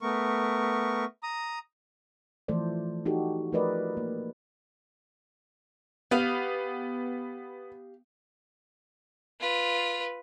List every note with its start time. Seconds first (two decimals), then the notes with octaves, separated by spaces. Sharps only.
0.01 A3 B3 A#4 C#6
1.23 A#5 D#6
2.48 E3 F3 A3 A4 C5 D5
3.06 D#4 F#4 G4 A4
3.52 F3 A3 A#4 B4 D5 D#5
3.97 A#3
6.11 B3 G4 F5
9.40 F4 B4